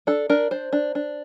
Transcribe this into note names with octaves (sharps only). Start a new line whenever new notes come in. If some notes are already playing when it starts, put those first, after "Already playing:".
D4 A4
D4 A#4
D4 C5
D4
D4